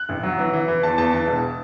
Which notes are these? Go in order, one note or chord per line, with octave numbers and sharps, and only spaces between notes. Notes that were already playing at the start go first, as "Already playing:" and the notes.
Already playing: F#6
A1
F#3
E3
E3
E3
E2 A5
E2 A5
E3 A5
E1